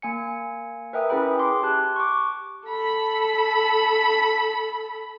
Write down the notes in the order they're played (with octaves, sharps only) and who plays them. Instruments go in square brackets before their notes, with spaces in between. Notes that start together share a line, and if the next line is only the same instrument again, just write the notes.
[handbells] A#3 G#5 C#7
A#4 B4 E5 G5 D#6
C#4 E4 G#4 B4 G5 B5
C6 D6
G4 A5 F#6
C#6 D6
[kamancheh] A4 B5